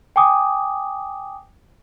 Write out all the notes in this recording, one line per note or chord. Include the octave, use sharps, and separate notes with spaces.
G5 G#5 D6 D#6